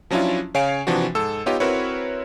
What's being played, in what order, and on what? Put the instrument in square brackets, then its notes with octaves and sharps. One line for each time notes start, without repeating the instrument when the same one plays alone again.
[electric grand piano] F3 F#3 C#4 D4 E4 F4
C#3 C#5 F5 G#5 C7 D7
C3 E3 F3 D4 F#4
G#2 A4 E6
B3 D#4 F4 G4 C#5 D#5
C4 E4 F#4 A#4 B4 C#5